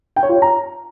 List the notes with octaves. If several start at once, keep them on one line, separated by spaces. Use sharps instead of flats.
G5
C#5
F4
C#5
A#5